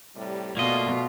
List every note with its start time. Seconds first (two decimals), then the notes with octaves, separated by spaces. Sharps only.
0.15 A2 C3 G3
0.57 B2 A3 A#3 F4 D5 D#5